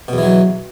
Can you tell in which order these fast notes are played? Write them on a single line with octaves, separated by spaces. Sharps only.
B2 E2 E3 F#3